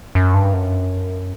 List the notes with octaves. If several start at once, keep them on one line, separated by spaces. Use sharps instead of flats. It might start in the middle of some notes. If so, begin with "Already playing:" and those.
F#2
G2
F#2